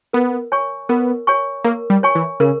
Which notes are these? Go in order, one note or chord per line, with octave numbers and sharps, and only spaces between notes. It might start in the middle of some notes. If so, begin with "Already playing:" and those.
B3 A#4
C#5 G#5 C#6
B3 A#4
C#5 G#5 C#6
A#3 A#4
G3
C#5 G#5 C#6
E3
C#3 A#4